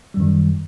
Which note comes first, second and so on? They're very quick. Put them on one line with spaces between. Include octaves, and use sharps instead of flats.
G3 F#2 D#3